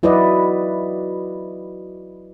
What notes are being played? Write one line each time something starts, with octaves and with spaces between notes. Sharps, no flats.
F#3 E4 F#4 B4 D5 D#5